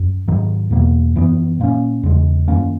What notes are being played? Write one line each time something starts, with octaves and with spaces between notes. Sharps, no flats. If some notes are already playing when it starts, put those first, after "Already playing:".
Already playing: F#2
G#2 D#3 F#3
E2 B2 A#3
F#2 E3 B3
A#2 A#3 C#4
E2 C#3 G#3
F#2 D#3 A#3 C#4